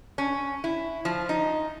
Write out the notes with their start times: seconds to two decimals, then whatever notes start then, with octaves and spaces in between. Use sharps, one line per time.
0.18 C#4
0.64 E4
1.05 F3
1.29 D#4